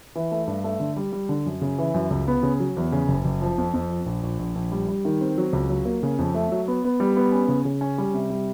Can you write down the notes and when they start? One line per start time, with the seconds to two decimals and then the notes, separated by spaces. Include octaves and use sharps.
0.15 E3
0.32 A3
0.47 G2
0.64 A3
0.80 D3
0.97 G3
1.12 G3
1.29 D3
1.46 F#2
1.62 C#3
1.78 E3
1.94 F#2
2.10 C#2
2.27 B3
2.43 C#3
2.60 F#3
2.77 E2
2.92 C#3
3.08 F#1
3.25 F#1
3.41 F3
3.58 F2
3.74 F2
3.90 F3
4.06 A#1
4.23 A#1
4.39 A#1
4.55 A#1
4.72 G3
4.88 G3
5.05 D#3
5.21 C4
5.38 F#3
5.53 C#2
5.69 F#3
5.85 A#3
6.03 C#3
6.19 F2
6.34 A3
6.52 F#3
6.68 B3
6.84 B3
7.00 G3
7.17 B3
7.32 C#4
7.48 C#3
7.65 C#3
7.81 C#4
7.98 G3
8.14 C3
8.30 G3